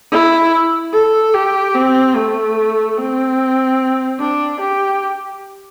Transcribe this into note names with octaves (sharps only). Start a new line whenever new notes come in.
E4
A4
G4
C4
A3
C4
D4
G4